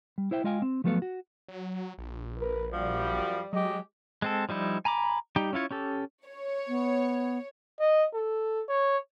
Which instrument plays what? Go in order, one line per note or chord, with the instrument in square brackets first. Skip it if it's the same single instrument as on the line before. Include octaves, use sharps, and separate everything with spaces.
[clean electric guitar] G3
E4 C5 E5 G5
G#3 F4 D#5 F5 G5 G#5
C4
F3 F#3 A3 B3 A4 F5
F#4
[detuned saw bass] F#3
A#1
[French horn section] A#4 B4
[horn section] F#2 F3 F#4 [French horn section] G3
[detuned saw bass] F#3 [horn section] G#3 G4 D#5
[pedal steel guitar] G#3 C4 A4
F3 G3 D#4 E4
G#5 A#5 B5 D6
G3 D#4 G4 G5
C#4 E4 F4 C#5
C#4 G4 A4
[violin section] C#5
[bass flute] B3
[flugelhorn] D#5
A4
C#5